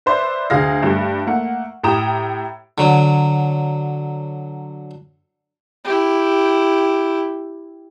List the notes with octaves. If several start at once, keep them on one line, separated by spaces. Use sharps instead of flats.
B4 C5 D5 E5
D2 G#4 F5 A#6
G2 G3 A3
A3 A#3 F#5
A2 G4 G5 A#5 D#6 E7
D3 F#3
E4 G4